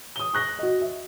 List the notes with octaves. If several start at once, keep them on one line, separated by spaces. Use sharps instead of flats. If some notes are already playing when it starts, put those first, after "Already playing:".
D#6 G7
C#6 F#6 A#6
F#4 D#5
E5